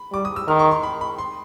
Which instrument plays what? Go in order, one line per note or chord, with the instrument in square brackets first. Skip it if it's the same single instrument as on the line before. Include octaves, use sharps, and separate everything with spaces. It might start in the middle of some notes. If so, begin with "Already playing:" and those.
Already playing: [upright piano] B5
[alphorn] G3 [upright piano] D6
[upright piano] D#6
E6
[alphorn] D#3 [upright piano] F6
[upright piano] C#6
C6
B5
B5
C6